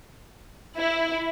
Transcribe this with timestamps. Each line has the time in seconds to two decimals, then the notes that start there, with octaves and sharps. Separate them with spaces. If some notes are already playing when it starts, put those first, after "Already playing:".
0.75 E4